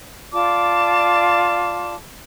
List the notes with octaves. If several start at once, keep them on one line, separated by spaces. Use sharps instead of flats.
F4 D5 A5 D6